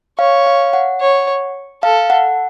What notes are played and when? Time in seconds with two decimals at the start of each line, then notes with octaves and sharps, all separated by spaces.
0.19 C#5 F5
0.47 F5
0.73 F#5
1.01 C#5
1.83 A4 F5
2.10 F#5